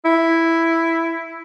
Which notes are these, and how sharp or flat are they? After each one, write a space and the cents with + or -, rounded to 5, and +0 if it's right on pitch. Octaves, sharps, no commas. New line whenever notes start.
E4 +0